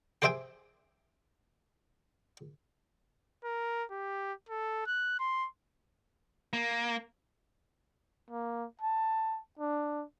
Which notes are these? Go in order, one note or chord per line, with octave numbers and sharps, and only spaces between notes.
G4 G#4 C5 E5 G5 G#5
A#4
G4
A4
F#6
C6
A#3
A#3
A5
D4